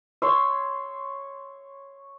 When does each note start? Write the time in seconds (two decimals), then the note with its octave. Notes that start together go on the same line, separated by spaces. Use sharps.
0.22 C#5 C6 E6